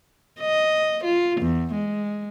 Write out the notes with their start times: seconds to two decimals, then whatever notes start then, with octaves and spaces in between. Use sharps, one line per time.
0.40 D#5
1.04 F4
1.41 E2
1.73 G#3